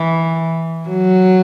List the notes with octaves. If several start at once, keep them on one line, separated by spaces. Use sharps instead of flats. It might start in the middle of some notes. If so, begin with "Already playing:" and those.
Already playing: E3
F#3